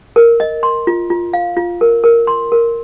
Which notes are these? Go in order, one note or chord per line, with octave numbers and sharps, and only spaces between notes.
A#4
D#5
C6
F4
F4
F5
F4
A#4
A#4
C6
A#4